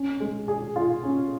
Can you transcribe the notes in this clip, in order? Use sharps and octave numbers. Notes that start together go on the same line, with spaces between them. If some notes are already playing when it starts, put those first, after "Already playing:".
Already playing: C#4
G#3
G#4
F4
C#4